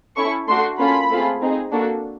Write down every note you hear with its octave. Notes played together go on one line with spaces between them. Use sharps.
C#4 E4 A4 C#6
A3 D4 F#4 C6
A#3 C#4 F4 A4 B5
A3 C4 F4 G#4
C4 D#4 G#4
A#3 D4 F#4 A4